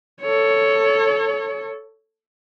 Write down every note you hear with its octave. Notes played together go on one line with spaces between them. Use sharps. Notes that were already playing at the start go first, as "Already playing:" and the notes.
A4 C#5